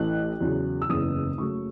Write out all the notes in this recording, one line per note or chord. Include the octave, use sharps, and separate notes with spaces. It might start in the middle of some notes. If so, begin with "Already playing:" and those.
Already playing: A1 A2 E3 A3 F#6
E2 C#3 F#3
E6
F#1 E2 C#3 E3 B3 D#6
F#1 F#2 C#3 F#3 A3 C#6